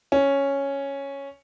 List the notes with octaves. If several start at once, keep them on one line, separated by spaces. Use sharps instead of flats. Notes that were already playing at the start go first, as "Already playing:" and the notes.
C#4